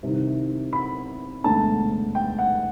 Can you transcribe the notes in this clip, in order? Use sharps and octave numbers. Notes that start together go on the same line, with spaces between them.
C2 C3 D#3
B5
E1 D2 D3 A5
G5
F#5